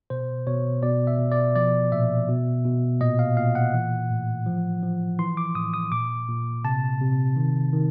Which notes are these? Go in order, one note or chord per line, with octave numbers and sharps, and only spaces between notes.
B2 C5
B2 C#5
B2 D5
E5
B2
D5
F3 D5
A#2 E5
B2
B2
A#2 D#5
F5
A#2 F5
F#5
E3
A2
F3
F3
E3 C6
D6
A2 D#6
D#6
A#2 D6
A#2
C3 A5
C3
D#3
D#3